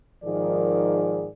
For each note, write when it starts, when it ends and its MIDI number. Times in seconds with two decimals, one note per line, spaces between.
0.23 1.28 44
0.23 1.28 51
0.23 1.28 53
0.23 1.28 68
0.23 1.28 70
0.23 1.28 74